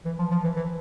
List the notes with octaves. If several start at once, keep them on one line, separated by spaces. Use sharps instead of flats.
E3
F3
F3
E3
E3